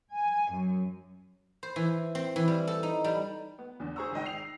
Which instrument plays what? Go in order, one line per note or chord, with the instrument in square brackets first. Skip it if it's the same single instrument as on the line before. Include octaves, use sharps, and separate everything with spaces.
[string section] G#5
F#2
[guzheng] C5
E3
C4
E3
G3
A4
D#4
G3
[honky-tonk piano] B3
E2 D3
G#4 C5 A#5 C#6 E6
G#1 D#3 D#5 G5
C7 F7